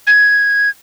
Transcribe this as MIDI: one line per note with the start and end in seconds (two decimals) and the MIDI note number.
0.07 0.70 92